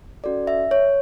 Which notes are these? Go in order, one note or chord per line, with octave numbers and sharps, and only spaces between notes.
C#4 F#4 A4 D5
E5
C#5